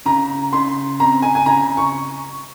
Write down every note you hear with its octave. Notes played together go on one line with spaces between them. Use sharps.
C#3 A#5
C#3 C6
C4 A#5
G#5
G#5
C#3 A#5
C#6